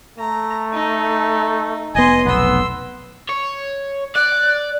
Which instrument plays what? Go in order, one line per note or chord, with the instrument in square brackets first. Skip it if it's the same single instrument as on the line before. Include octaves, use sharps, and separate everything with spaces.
[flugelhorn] A3 [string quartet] A#5
[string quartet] D#4
[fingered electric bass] F1 B3 [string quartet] D#5 C6 [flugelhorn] G#5
[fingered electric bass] F1 B1 [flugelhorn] B3 [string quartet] C6 E6
[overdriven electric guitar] C#5
[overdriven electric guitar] D5 [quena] F#6